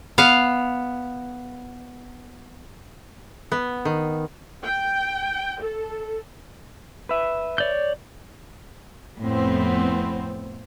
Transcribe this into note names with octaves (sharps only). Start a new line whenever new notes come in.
B3 F5
B3
D#3
G5
A4
B4 E5
C#5 D5 G6
F2 A2 B3 C4